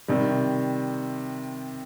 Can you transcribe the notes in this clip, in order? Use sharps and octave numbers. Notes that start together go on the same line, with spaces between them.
C3 D#3 G3